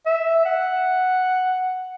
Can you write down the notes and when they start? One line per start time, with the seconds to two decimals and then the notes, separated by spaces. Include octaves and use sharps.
0.06 E5
0.45 F#5